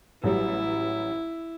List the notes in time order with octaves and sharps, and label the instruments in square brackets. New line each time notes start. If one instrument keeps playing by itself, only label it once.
[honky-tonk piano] A1 F#3 G3 [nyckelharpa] E4